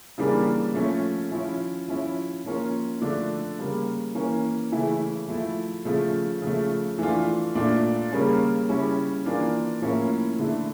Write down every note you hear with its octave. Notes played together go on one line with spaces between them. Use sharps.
C#3 E3 G3 A#3 D4
F3 A3 C#4
F3 C#4 E4
F3 C#4 E4
F3 A#3 C#4 F4
D3 F3 A3 D4
C#3 G3 A#3
E3 A#3 C#4
C#3 E3 A3 E4
F3 A3 E4
C#3 F3 A3
C#3 F3 A3
E3 A3 D4 F4
A#2 A3 D4 F4
C#3 G3 A#3 C#4
C#3 G3 C#4 E4
E3 A#3 D4 F4
A2 F3 A#3 C#4 E4
D3 A3 E4